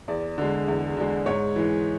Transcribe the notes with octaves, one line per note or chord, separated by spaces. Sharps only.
E2 D5
D3 G#3
E2
D3 G#3
G#2 C#5
E3 G#3